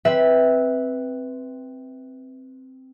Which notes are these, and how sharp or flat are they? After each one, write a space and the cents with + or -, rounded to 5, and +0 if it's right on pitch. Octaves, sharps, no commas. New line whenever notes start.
C4 +0 B4 +0 E5 -15